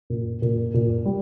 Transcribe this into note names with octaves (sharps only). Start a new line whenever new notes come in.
A#2
A#2
A#2
G3